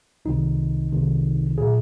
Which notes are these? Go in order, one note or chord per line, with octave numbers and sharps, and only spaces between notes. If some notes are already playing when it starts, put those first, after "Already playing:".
C2 C3 D#3 D#4
C2 C3 D#3
A#2 G#4